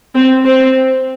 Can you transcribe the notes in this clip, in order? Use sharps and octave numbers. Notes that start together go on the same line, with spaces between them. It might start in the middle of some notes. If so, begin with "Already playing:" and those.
C4
C4